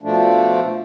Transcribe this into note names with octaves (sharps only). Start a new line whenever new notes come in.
B2 F3 A3 D4